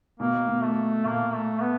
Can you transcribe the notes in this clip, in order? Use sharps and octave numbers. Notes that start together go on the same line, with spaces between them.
B2 A#3
B2
A3
A#2 A#3
A3
B3